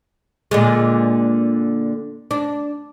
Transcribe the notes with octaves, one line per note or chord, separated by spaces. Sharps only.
A#2 D3 G#3
D4